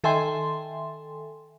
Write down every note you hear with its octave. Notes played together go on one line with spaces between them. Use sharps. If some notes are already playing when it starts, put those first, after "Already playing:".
D#3 A4 E5 G5 G#5 C6